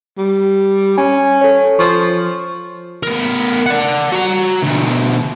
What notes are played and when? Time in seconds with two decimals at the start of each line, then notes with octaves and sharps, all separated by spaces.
0.18 G3
0.98 C#4 G#5
1.41 A4 C#5
1.79 F3 C#6
3.03 B3 A#4
3.66 D5 F#5
4.13 F#4 A#5
4.63 D2 B2